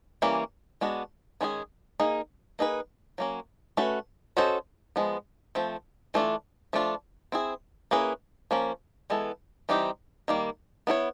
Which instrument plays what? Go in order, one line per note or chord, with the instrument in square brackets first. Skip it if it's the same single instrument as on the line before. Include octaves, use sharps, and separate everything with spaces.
[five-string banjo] E3 G3 A#3 C#4
G#3 B3 D4 F#4
D#3 G#3 C#4 E4 G#4
A#3 D#4 G#4
A#3 D#4 G#4 B4
F#3 A#3 C#4
A3 C#4 F#4 B4
C#4 F#4 A4 C5 D#5
F3 G#3 B3
F3 A3 C4
E3 A3 D4 F4
F3 A3 D4 F4
C4 E4 G#4
A#3 C#4 E4 G#4 B4
F3 A#3 C#4
E3 G#3 B3 E4 A4
E3 G3 C4 D#4 G4
D#3 G3 A#3
B3 E4 A4 C#5